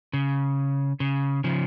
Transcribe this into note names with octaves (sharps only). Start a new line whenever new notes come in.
C#3
C#3
C#3 F3